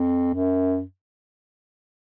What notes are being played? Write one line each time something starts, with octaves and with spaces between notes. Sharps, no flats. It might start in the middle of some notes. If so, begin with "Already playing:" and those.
Already playing: F2
F#2